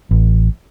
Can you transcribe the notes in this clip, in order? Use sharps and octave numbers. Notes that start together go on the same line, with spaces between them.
A1